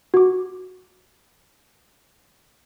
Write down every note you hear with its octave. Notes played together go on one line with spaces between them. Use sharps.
F#4 D6